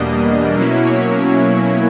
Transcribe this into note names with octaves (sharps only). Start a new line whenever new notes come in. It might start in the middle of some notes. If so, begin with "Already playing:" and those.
Already playing: E2 B2 G3 A#3 D4 D#5
B2 F#3 A#3 C#4 E4
C#5